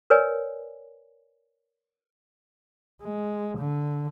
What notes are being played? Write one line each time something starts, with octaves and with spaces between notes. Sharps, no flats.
A#4 B4 C#5 D5 G#5
G#3
D3